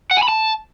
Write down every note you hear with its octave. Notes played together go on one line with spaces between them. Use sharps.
F#5
G#5
B5
A5